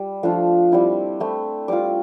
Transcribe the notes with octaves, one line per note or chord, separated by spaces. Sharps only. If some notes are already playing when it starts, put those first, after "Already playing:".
Already playing: G3
F3 A3 D4 F4
G3 C4 E4
A3 C4 E4
G3 C4 F4 D6